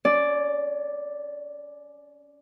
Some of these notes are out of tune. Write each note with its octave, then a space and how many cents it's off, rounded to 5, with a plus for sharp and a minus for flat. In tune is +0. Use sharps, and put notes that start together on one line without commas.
C#4 +30 D5 +0